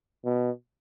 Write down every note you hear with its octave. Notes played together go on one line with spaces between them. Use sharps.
B2